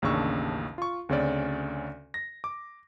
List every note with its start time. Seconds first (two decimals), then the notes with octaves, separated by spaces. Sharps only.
0.02 A1 D#2 C#3 D4 C#6 E6
0.78 F4 C#6
1.09 D2 C#3 C4 C#4 D5
2.14 A#6
2.44 D6